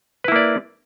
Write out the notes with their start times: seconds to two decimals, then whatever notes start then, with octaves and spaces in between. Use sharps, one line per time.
0.24 B4
0.28 E4
0.32 A#3
0.36 D5